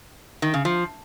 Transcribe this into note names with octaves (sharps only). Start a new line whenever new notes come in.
D#3
C#3
F3